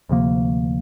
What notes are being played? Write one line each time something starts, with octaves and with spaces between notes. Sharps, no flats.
D2 C3 F3 A#3